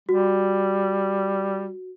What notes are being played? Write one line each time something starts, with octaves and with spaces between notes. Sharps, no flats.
G3 F#4